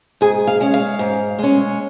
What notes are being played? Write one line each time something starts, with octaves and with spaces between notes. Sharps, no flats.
G#2 G#4
F5
G#3 C#4
F5
G#2
G#3 C#4